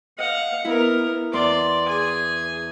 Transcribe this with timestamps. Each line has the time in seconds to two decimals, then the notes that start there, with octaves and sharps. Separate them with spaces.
0.18 D#5 F5 F#5
0.65 B3 E4 A#4
1.33 E2 D5 C6
1.87 G#4 G#5